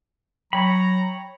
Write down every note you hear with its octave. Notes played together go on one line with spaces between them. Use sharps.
F#3 C#5 G5 A#5 B5